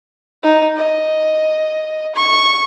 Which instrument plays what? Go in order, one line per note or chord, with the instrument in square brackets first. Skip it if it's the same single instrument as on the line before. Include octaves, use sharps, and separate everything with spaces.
[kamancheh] D#4
D#5
C#6